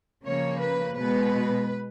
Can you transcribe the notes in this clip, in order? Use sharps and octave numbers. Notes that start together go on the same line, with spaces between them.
C#3 F3 A#3 C#5
B4
B2 G#3 B3 B4